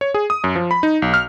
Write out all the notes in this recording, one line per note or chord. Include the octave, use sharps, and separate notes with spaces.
C#5
G#4
D#6
F#2
F3
B5
D#4
B1
F6